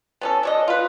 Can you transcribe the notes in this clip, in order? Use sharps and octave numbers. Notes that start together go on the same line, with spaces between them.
B3 C#4 A4
D4 C#5 D#5
F4 B4